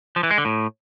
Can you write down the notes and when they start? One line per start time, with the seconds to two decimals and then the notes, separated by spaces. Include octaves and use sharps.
0.16 F3
0.23 E3
0.31 G#3
0.38 D3
0.45 A2